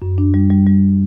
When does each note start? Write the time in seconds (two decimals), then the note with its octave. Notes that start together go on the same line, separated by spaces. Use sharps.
0.02 F#2
0.18 D4
0.34 G3
0.50 G3
0.67 G3